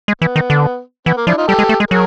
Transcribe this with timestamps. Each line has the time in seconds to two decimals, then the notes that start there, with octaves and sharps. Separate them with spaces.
0.08 G#3
0.21 E3 B3
0.36 D#3
0.50 D3
1.06 E3 B3
1.17 A#3
1.27 F3 D4 E4
1.37 D#4 F4
1.48 G3 G4 A4
1.59 G#3
1.69 A3
1.80 G#3
1.91 F#3 G#4 A#4